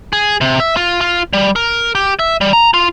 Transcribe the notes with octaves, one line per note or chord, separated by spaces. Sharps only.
G#4
C3
E5
F4
F4
G3
A#4
G4
E5
G3
A#5
F4